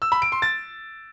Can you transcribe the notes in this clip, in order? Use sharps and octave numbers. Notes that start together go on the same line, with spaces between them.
E6
B5
D7
C6
A6